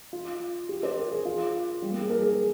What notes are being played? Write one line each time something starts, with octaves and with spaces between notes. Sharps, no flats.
F4
G4
C5
A#4
G#4
F4
G3
A#3
G#4
A#4
G#4
A#4